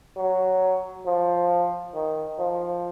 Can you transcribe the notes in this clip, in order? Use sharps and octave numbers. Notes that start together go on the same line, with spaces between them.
F#3
F3
D#3
F3